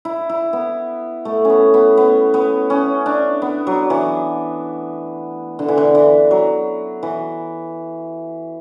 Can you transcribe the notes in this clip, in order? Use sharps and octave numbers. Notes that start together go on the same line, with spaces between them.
E4
E4
B3
A3
B3 C#4
B3
B3
B3
C#4
D4
B3
F#3
E3
D3
E3
D3
E3
F#3
E3